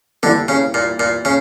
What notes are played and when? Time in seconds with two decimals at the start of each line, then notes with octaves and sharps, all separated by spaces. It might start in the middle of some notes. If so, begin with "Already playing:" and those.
0.23 D3 E3 G3 A#3
0.48 C#3
0.74 A#2
1.00 A#2
1.25 C#3